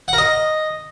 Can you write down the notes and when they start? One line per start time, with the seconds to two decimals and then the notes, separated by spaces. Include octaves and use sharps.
0.08 F#5
0.13 A#4
0.18 D#5